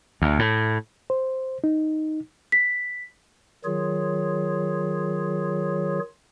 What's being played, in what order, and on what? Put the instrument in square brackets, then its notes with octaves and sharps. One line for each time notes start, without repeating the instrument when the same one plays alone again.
[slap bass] D2
A2
[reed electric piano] C5
D#4
[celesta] B6
[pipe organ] D#3 F#3 F4 G#4 C#5